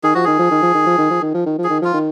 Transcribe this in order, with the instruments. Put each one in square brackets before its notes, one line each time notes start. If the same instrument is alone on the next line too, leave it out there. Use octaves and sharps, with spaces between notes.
[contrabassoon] D#3 [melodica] G#4
[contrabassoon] F3 [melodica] F#4
[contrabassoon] D#3 [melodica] G#4
[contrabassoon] F3
D#3
F3
D#3
F3
D#3
F3
D#3
F3
D#3
F3
[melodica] G#4
[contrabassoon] D#3
[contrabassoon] F3 [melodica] F4
[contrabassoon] D#3